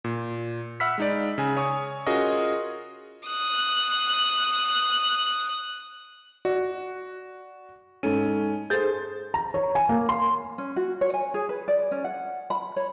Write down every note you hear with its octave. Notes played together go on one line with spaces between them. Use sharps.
A#2
E5 F#5 B5 E6 F6 B6
G#3 D#4 D5
C#3 G#5
C#5 G#5 C#6 D#6
C#4 F4 F#4 G#4 A#4 D#5
D#6 F#6
F#4 D5
G#2 C#4 A4 D#7
G#4 A4 C5 G6 A6
A#5
C#5
G#5
A#3
C6
C#4
F#4
C#5
G#5
G#4
B4
D5
C#4
F#5
B5
C#5